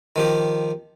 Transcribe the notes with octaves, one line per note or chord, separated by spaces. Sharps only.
D#3 F3 G4